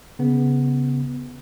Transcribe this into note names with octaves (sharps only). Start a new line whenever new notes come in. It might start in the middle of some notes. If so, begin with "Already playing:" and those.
C#3 B3